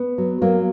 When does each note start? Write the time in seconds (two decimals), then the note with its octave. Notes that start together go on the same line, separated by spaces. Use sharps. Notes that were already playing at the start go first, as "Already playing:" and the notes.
Already playing: B3
0.18 F#3
0.42 F#3 A#3